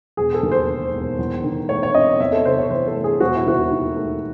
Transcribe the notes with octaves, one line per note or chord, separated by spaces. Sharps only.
E1 G#4
A4
D#2
C5
D#3
E1
E2
D#3
A3 C#5
C#5
C4 D#5
E2 E5
A4
C3 C5
C#5
E3 C5
A4
A3
G#4
E1 F#4
E4
D#2 F#4
D#3
A3